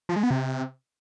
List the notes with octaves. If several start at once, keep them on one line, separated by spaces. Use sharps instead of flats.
F3
G#3
B3
C3